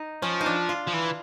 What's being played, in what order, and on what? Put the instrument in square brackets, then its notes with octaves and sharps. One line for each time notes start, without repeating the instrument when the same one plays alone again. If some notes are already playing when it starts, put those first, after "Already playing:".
Already playing: [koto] D#4
[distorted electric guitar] F3 [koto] C#4
[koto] D#4
D4
F4
[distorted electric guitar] F3
E3